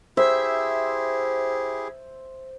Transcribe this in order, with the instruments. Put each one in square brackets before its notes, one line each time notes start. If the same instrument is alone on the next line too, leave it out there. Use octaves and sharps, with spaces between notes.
[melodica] E4 G4 G#4 [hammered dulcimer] C5 [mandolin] E5